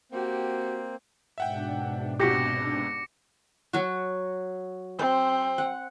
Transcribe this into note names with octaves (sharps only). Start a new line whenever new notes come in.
A#3 C4 F#4 G4
G#2 B2 D4 E5 F#5 G5
C#2 C3 F#4 G4 D6 A#6 C#7
F#3 F#4
C4 C5
F#5